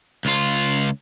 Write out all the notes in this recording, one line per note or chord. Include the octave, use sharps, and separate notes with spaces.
C#2 F4